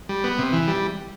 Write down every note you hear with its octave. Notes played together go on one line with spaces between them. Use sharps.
G3
B3
C3
E3
G3